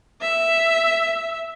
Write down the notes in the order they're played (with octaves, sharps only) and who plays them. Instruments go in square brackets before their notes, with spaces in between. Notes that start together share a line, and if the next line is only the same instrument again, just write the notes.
[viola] E5